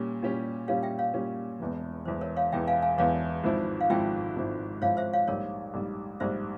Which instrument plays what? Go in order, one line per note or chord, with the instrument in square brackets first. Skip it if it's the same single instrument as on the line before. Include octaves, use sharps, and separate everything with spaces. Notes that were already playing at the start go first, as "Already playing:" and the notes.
Already playing: [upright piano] A#2 G3 C#4 G4
A#2 G3 C#4 G4
[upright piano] A#2 G3 C#4 G4 [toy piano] C#5 F5
[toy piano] E5 G5
C#5 F5
[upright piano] A#2 G3 C#4 G4
E1 E2 E3
[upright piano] E1 E2 E3 [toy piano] C5
[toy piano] A#4 C#5
C#5 F5
[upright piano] E1 E2 E3 [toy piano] E5 G5
[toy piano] F5 G#5
F5 G#5
[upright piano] E1 E2 E3 [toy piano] C#5 F5
[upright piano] G#1 G#2 F3 C4 E4
[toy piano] F5
[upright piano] G#1 G#2 F3 C4 E4 [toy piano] E5 G5
[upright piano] G#1 G#2 F3 C4 E4
[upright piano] G#1 G#2 F3 C4 E4 [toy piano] C#5 F5
[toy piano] C5 E5
C#5 F5
[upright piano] A#1 G#2 G3 [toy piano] A#4 C#5
[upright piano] A#1 G#2 G3
[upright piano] A#1 G#2 G3 [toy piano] C5 E5